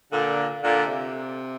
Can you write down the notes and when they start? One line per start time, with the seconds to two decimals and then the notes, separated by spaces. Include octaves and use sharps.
0.13 A#2 D3
0.63 A#2 D3
0.83 C3